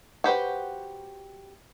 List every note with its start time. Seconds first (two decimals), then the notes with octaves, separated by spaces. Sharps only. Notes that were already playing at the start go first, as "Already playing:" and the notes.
0.24 F#4 G4 B4 C5